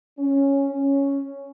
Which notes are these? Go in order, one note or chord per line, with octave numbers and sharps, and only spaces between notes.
C#4
C#4